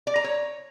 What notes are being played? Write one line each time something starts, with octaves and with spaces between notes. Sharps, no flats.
D5
A#5
C#5